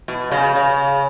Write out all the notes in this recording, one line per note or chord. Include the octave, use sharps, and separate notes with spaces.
B2
C#3
C#3